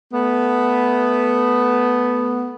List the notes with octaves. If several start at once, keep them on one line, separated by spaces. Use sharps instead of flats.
A3 B3